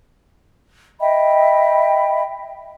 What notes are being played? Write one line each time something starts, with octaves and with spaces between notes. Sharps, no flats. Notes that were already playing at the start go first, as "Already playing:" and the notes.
D#5 E5 G5 B5